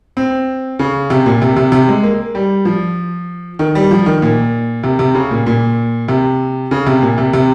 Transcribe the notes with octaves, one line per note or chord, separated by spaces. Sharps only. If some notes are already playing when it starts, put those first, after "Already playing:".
C4
C#3
C3
A#2
C3
C3
C3
G#3
A#3
G3
F3
D#3
G3
F3
D#3
A#2
C3
C3
C#3
A#2
A#2
C3
C#3
C3
A#2
C3
C3